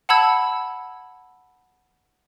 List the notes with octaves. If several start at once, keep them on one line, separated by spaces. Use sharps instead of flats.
F#5 A5 B5 E6 G#6